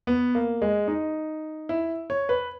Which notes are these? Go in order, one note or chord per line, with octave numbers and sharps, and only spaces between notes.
B3
A#3
G#3
D#4
E4
C#5
B4